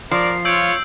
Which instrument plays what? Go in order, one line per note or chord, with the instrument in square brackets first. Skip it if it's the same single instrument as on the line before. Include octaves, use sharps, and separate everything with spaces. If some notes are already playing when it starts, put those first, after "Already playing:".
[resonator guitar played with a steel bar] F3 [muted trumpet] A#4 [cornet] D5 [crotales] C7
[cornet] F4 [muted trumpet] C#5 [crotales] E6 G6 D7